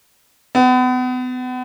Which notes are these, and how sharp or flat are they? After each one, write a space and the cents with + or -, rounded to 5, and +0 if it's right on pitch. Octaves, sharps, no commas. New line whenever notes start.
B3 +35